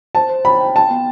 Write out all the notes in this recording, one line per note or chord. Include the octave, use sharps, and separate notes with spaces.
C5 A5
C5
G5 B5
G5
G5 A5
B3